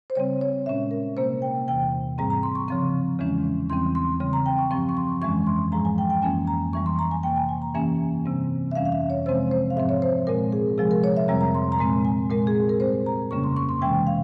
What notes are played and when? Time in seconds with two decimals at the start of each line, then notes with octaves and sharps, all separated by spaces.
0.10 C5
0.15 C#3 G3 C4 C#5
0.41 C#5
0.66 A#2 G#3 C#4 E5
0.91 A#4
1.17 C3 G3 A#3 C5
1.42 G5
1.68 E2 C3 E3 G5
2.18 G#2 G3 C4 A#5
2.30 A#5
2.43 C6
2.55 C#6
2.68 C#3 F3 C4 C6
3.19 E2 C#3 E3 G#3 C#4
3.70 E2 E3 G3 C4 C6
3.95 C6
4.20 C#3 G3 C4 C6
4.33 A#5
4.46 G5
4.59 C#6
4.71 G2 F3 C4 C#6
4.89 C#6
4.97 C6
5.21 F2 E3 G#3 C#4 C#6
5.47 C6
5.72 G#2 F3 G#3 A#5
5.85 G#5
5.98 G5
6.10 G5
6.22 F2 E3 A#3 C#4 G#5
6.47 A#5
6.73 F2 E3 G3 C#6
6.86 C6
6.99 A#5
7.11 G#5
7.23 C3 G3 A#3 G5
7.36 G#5
7.49 G#5
7.62 A#5
7.74 G2 E3 A#3 C#4 G#5
8.25 C3 G3 C4
8.71 E5
8.75 F2 E3 G3 C#4 F5
8.86 F5
8.92 E5
9.10 C#5
9.26 C3 F3 G#3 C4 C5
9.51 C5
9.70 F5
9.76 G#2 F3 C4 E5
9.89 C#5
10.02 C5
10.27 A#2 G#3 C4 A#4
10.53 G#4
10.78 C3 F3 G#3 G#4
10.91 A#4
11.04 C#5
11.17 E5
11.28 F2 C3 G3 C4 A#5
11.41 A#5
11.54 C6
11.72 A#5
11.79 A#2 G#3 C4 C6
12.05 G#5
12.30 A#2 G#3 C4 A#4
12.47 G#4
12.69 A#4
12.80 G2 G3 C4 C5
13.06 A#5
13.31 F2 C#3 G3 A#3 C#4 C#6
13.44 C6
13.57 C#6
13.69 C6
13.81 C3 E3 G#3 C#4 G5
14.07 F5